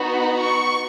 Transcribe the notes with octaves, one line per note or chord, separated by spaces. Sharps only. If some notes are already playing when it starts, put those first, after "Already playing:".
Already playing: B3 D#4 F#4
C#6